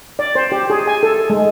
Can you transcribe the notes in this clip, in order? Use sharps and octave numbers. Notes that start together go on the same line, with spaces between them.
D5
C5
G4
G#4
G#5
A4
G#3